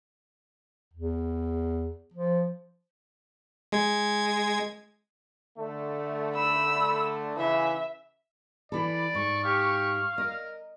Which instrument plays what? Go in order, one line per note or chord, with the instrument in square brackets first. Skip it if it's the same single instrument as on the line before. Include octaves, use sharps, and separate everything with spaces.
[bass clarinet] E2
F3
[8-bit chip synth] G#3 G#6
[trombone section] D3 A3
[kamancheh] B5 E6
[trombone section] C#3 E3 [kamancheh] E5
[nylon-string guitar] E3 A4 [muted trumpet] D5 [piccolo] B5
[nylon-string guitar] G#2 [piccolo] C#6
[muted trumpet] G4 [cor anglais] F5
[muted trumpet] A#4 [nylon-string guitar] D#5